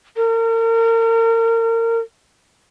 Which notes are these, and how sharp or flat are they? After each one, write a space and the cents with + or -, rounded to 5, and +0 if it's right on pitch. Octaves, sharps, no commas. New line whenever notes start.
A#4 -35